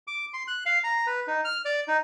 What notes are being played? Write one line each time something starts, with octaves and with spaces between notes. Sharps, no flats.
D6
C6
F#6
F5
A#5
B4
D#4
F6
D5
D#4